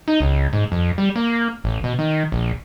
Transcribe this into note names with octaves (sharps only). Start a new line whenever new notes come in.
D#4
C#2
G#2
F2
G3
A#3
A1
B2
D#3
A#1